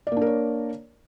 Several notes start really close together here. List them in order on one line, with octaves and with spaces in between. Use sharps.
D5 A#3 D4 A#4 C#5